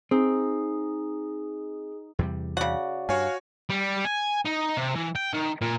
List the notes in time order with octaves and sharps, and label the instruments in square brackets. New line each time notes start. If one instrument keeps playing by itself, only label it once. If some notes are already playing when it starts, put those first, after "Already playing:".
[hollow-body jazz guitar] C4 [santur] D#4 [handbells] G#4
[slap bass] E2 C3 G3
[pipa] C#3 F#5 [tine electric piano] F#4 D5
[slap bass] G2 [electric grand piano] F#4 C#5 G#5 [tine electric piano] F5 F6
[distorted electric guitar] G3
G#5
D#4
C3
E3
G5
D#3
A#2